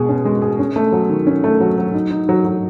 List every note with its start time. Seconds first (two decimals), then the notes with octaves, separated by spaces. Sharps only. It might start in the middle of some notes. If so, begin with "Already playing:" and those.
Already playing: B2 G#3 G#4
0.09 C#4
0.25 G#3
0.42 G#4
0.59 C#4
0.76 A3
0.92 F#3
1.09 D#3
1.27 C#4
1.44 A3
1.60 F#3
1.78 F#3
1.94 D#4
2.11 D#4
2.29 F#3
2.45 F#3